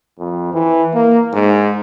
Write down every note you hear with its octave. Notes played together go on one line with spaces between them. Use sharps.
F2
E3
A#3
G#2